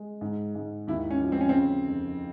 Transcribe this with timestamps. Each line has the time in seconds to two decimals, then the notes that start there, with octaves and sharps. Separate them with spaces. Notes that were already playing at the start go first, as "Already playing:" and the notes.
Already playing: G#3
0.21 G#2
0.55 G#2
0.87 D#2 E4
1.10 C#4
1.21 F3
1.32 C4
1.41 C#4
1.49 C4
1.55 C#3
1.88 F2